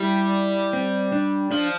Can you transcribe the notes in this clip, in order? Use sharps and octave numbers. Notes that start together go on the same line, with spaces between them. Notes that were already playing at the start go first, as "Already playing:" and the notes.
Already playing: G3 E4
C4
D4
F3 D4